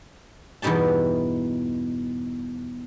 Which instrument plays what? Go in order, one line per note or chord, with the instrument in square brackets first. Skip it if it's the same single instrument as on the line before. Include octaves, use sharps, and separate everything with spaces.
[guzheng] E2 G2 B2 D#4 G4 A5